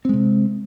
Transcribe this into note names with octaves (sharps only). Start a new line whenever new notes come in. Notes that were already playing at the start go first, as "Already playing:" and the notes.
C3 G#3 C4